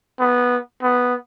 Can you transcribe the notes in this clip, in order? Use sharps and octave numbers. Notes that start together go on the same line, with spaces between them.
B3
B3